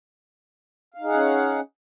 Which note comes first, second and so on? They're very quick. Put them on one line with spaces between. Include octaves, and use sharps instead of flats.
F5 D#4 G#4 F#5 C#4